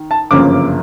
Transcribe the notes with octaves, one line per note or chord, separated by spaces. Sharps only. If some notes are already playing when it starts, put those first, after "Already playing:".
Already playing: D#3
A5
G1 F#2 C#3 F3 A#3 D6